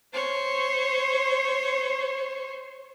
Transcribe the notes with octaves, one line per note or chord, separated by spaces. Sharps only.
C5 C#5